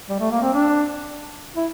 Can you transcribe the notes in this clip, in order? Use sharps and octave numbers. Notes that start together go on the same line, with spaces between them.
G3
A3
A#3
C4
D4
E4